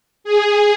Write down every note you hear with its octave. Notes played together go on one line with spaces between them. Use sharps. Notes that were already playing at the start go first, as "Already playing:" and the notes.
G#4